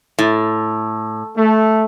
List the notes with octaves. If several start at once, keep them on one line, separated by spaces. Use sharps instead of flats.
A2
A3